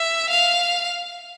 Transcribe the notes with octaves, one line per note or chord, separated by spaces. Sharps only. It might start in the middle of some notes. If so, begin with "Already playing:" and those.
Already playing: E5
F5